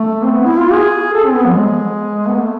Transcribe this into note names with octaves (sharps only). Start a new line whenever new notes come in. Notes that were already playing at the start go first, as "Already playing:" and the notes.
Already playing: A3
C4
B3
E4
F4
G#4
A4
C4
B3
F3
G#3
B3
A3